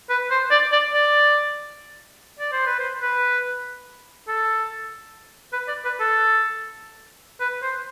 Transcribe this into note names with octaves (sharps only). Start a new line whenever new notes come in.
B4
C5
D5
D5
D5
D5
C5
B4
C5
B4
A4
B4
D5
B4
A4
B4
C5